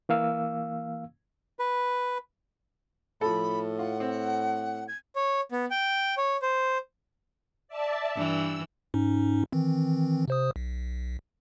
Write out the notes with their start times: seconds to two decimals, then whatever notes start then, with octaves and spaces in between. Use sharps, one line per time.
0.09 E3 A#3 F5 E6
1.59 B4
3.21 A2 F3 A4 B5
3.79 F4 F#5
4.00 C4
4.88 G#6
5.16 C#5
5.52 B3
5.71 G5
6.17 C#5
6.42 C5
7.68 D5 E5 A5
8.15 G2 E3 E6
8.94 G#2 C#4 D#4
9.52 D#3 E3 C4
10.28 C3 C5 D#6
10.56 B1